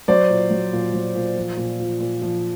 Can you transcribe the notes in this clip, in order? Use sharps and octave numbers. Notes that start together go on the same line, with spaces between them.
F#3 C5 D5
A#2
F#3
A#2
F#3
A#2
F3
A#2
F3
A#2
F3